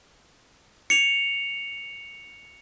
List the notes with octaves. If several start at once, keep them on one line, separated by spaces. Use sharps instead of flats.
C#7 F7